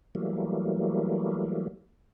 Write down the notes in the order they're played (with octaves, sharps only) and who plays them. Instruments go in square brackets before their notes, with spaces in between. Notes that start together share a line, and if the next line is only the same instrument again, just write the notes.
[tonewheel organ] E3 F#3 G3 A3 A#3